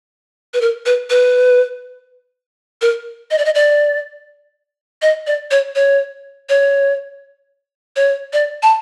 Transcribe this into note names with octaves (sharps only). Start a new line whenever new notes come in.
B4
A#4
B4
B4
A#4
D#5
D5
D#5
D5
D#5
D5
C#5
C#5
C#5
C#5
D5
A5